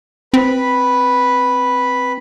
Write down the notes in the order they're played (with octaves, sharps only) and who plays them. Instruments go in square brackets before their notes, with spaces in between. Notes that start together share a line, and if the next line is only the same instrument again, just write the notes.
[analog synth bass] C4 [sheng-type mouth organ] B4 B5